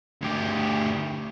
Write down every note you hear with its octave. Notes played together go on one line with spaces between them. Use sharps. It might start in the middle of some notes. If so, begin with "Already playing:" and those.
D2 G4